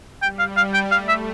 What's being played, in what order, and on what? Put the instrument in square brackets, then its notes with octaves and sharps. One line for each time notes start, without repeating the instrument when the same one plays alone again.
[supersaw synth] G3 [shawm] G5
[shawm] F5
F5
G5
[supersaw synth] A3 [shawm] F5
[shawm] E5